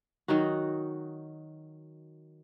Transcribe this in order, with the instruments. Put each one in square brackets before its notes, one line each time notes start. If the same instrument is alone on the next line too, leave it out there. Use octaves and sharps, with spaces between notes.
[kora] D#3 F#3 D#4 F#4